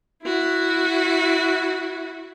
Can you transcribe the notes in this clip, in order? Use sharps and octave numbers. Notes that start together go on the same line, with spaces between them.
E4 F#4